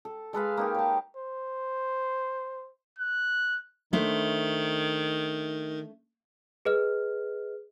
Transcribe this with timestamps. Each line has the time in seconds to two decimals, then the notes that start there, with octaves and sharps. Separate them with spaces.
0.05 A4
0.33 G#3 A4 B4 F5
0.57 A#3 D#4 G4
0.74 C#5 A5
1.16 C5
2.99 F#6
3.93 D#3 A3 D4 C5
6.65 G#4 B4 D#5 F6